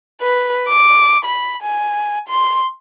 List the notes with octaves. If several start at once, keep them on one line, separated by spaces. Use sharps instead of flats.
B4
D6
B5
G#5
C6